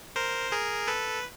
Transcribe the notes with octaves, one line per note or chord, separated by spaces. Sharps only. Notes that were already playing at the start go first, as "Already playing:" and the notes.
A#4 C5
G#4 A#4
A4 B4